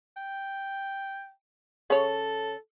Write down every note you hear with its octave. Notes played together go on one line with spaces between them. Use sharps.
G5
C#3 A4 C#5